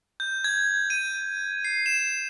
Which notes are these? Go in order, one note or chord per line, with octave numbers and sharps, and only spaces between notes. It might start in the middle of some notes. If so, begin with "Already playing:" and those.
G6
G#6
D#7
C7
E7